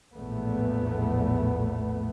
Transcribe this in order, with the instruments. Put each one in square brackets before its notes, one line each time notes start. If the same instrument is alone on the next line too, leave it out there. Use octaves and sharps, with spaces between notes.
[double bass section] A#1 E2 A2 A3 B3